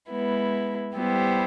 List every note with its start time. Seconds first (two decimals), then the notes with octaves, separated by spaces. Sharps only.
0.10 G#3 B3 E4
0.95 G3 B3 E4 G4 C5